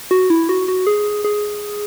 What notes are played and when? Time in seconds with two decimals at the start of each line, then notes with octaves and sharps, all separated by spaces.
0.11 F#4
0.30 E4
0.49 F#4
0.68 F#4
0.87 G#4
1.24 G#4